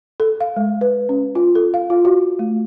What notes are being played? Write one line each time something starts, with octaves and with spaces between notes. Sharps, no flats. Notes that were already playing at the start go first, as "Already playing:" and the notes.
A4
F5
G#3
B4
C#4
F4
A4
F5
F4
F#4
A3